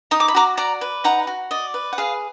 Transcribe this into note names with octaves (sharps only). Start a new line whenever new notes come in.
D#4 D#6
D6
B5
F#4 A#5 D6
D5 F#5 A#5
B4
D#4 F#5 A#5
F#4
D5 D#5
B4
F#5
G#4 F5